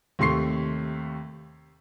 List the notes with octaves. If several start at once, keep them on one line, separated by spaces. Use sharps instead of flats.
D#2 C3 A3 C6 C#6 C7